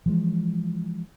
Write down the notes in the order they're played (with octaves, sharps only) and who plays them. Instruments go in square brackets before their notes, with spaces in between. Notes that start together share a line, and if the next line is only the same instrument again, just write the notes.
[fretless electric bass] E3 F3 G#3